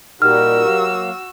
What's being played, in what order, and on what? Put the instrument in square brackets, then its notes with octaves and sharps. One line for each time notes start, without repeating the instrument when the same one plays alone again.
[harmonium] A#2 G3 D#4 [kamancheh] F#4 E6 [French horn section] G4 A#4 [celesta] F6
[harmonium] F#3 A#3 F5